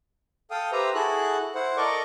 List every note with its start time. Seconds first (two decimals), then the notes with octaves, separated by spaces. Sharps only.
0.51 A4 F5 G5 D#6
0.72 G4 B4 C5 E5 A#5
0.94 E4 F#4 G#4 A4 F#6
1.55 E4 C5 F#5
1.77 A4 A#4 D5 D#5 C#6 D6